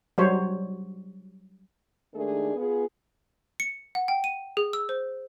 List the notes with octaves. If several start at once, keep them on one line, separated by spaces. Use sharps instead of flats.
F#3 G3 C5 C#5
D#2 D#3 G#3 A3 D4 G#4
B3 F4 G#4
C#7
F#5
G5
D#7
G#4
E6
C5